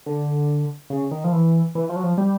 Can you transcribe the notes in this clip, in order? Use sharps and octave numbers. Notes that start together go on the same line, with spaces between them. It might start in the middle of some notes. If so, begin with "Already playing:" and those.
D3
C#3
D#3
F3
E3
E3
F3
F#3
F3
G3